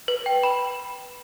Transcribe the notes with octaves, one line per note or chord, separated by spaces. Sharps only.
B4
G5
B5